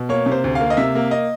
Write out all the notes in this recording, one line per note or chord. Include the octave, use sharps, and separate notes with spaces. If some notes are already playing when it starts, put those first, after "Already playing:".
Already playing: B2
A#3 C#5
C3
C5
D2
F5
A#3
D#5
C3 E5
A#3
D#5